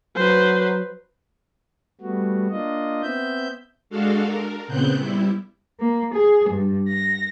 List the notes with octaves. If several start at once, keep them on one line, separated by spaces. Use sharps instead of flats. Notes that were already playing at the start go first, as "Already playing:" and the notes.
F#3 B4 C5
G3 A3 B3 F#4
A#3 D4 F4 D#5
B3 C4 E5 G6
G#3 D4 F#4 A4 F5
A#4
A#2 C#3 B3 C4 F#6 G6
G3 E4
A#3
G#4
G2
A#6